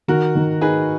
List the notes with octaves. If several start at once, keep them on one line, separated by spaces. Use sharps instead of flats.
D#3 F#4 A#4
D#3
D#4 G#4 B4